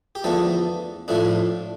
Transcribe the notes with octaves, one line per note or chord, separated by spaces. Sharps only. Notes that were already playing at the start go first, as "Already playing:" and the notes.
G4
E2 D3 F3 A3 A4
A2 F3 A3 D4